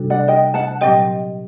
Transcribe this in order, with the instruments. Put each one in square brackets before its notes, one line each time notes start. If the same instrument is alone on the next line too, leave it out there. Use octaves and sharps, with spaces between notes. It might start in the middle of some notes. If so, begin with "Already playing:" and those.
Already playing: [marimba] C3 G3 D4 F#4 A4
[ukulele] D5 F#5
D#5 G5
F#5 A5
[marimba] A#2 F#3 C4 G4 [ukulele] D#5 G5